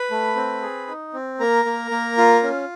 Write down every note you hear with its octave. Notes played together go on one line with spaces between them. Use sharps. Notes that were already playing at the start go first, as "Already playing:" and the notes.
Already playing: B4 B5
A3
C4
G#4
D#4
C4
A#3 A#4 A#5
A#3
A#3
F4
C#4